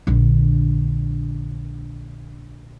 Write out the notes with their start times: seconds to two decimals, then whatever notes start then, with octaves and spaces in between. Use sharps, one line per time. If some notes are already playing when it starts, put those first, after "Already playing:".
0.07 A#1 D3